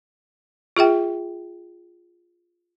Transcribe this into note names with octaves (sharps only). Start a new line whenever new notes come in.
F4 G#4 E5 G5